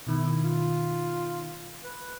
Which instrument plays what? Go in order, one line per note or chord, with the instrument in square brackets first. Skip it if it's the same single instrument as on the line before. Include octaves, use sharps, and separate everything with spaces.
[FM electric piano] B2 D#3 [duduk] E4
[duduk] F4
B4